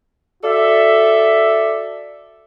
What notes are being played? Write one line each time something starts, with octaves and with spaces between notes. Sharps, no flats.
F#4 A4 D5 E5